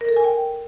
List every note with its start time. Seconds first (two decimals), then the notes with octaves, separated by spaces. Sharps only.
0.01 A#4
0.09 A4
0.16 G#5
0.24 G5